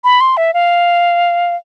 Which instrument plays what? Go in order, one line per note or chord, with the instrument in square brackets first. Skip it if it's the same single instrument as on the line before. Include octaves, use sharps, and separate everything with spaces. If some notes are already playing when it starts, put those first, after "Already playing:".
[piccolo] B5
C6
E5
F5